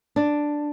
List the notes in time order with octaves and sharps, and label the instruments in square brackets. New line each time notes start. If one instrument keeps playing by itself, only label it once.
[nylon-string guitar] D4